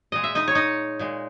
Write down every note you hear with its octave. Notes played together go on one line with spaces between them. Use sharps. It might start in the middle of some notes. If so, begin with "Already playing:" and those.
A#2 G#3 D#5
E5
D#4 D#5
C#5
D#4 D#5
A#2 G#3